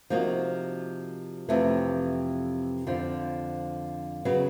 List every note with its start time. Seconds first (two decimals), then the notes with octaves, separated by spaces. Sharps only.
0.10 C3 F3 A#3 D#4 F#4
1.49 F2 C3 E3 A3
2.87 F2 D3 F3
4.25 C#3 F#3 B3